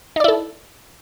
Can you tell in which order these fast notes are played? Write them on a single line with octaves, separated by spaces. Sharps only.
D#4 D5 E4 A4